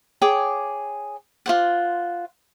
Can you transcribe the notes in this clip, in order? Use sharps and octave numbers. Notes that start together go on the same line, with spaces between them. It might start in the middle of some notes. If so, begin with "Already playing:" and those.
G#4 C#5 G5 D6
F4 C5 F#5